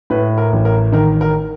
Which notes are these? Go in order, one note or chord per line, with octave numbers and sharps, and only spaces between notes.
A2 B4
A#4
A1
A#4
D#3 A#4
A#4